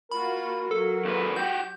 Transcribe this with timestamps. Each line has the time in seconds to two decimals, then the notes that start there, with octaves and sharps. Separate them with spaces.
0.11 A#3 F4 F#4 A#4 B5
0.71 F#3 A4
1.05 D#2 B4
1.36 F#4 G4 G6